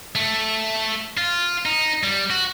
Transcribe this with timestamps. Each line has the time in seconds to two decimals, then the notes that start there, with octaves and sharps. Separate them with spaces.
0.15 A3
1.17 F4
1.66 D#4
2.03 G3
2.30 F#4